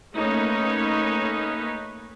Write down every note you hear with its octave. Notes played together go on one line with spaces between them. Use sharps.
A3 A#3 C#4 D#4 B4 C#5